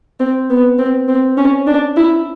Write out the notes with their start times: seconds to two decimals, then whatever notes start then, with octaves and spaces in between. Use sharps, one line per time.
0.20 C4
0.49 B3
0.78 C4
1.08 C4
1.37 C#4
1.67 D4
1.97 E4